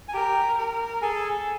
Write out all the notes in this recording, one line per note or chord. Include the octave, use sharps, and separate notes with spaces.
G#5
G4 A#4 G5
A#4
G#4 A4 G#5